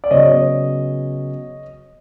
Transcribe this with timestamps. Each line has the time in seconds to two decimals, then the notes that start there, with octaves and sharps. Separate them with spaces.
0.04 D5
0.11 C#3 F#3 B3 C#5 D#5